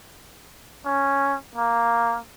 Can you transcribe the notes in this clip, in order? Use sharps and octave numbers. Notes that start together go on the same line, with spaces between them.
C#4
A#3